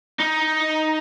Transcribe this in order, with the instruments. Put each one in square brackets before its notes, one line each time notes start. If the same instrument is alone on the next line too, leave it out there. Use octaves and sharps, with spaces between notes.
[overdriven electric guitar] D#4